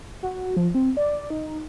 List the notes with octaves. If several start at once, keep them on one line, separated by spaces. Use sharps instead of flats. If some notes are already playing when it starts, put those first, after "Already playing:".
F#4
F3
C4
D5
D#4